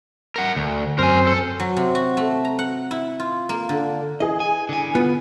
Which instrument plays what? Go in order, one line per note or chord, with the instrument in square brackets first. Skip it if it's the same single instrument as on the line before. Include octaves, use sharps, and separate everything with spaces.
[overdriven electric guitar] A#4 F#5
D2
[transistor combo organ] F#2 C4 C5 [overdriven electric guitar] A#4 G#5
[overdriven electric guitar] A4
[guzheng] F#3
C3
F#4
A3
A#5
F#5
E4
F4
A#3
D3
[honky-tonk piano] E3 G#4 [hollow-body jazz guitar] D#5
[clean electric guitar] G#5
D3 G#5
[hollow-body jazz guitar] B3 F4